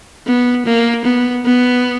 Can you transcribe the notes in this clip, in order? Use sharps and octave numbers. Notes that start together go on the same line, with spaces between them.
B3
A#3
B3
B3